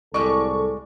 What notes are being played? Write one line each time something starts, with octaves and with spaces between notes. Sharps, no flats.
C2 A2 G#3 A4 D5 C#6